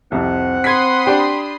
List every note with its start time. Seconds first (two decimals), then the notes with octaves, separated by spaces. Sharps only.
0.12 C2 F2 C4 F#5
0.64 B5 C6 D#6 G#6 B6
1.06 D4 G4 G5